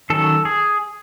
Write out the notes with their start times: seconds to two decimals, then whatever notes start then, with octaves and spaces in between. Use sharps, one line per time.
0.10 D#3 F#3 C#4 A4
0.45 G#4